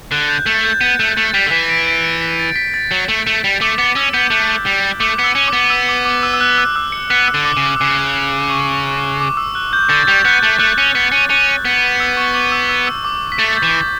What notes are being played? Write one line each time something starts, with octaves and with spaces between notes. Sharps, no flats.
D3 F#6
G6
A3 A6
G6
B3 C#7
A3
A3 A6
G3 B6
D3
E3 B6
D7
D7
C#7
B6
A6
B6
A6
F#3
A3
A3
G3
A3 D6
B3 D6
C#4 E6
B3 G6
A3 F#6
G3
A3 D6
B3
E6
C#4
D6
B3
E6
D6
D6
E6
E6
F#6
E6
E6
C#7
B3 F#6
E6
D3
D6
C#3
D6
E6
C#3 D6
C#6
D6
E6
F#6
G6
D3 A6
G3 G6
B3 F#6
A3 A6
A3 F#6
C#4
B3
C#4
C#4
B3
E6
C#6
D6
E6
E6
E6
D6
B6
A3 A6
G6
E3